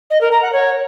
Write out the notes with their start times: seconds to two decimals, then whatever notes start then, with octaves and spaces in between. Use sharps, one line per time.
0.10 D#5
0.21 A#4
0.32 A#5
0.42 F#5
0.53 C#5